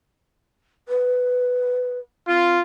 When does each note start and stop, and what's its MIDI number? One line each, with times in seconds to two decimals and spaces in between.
0.88 1.99 71
2.28 2.57 60
2.28 2.61 65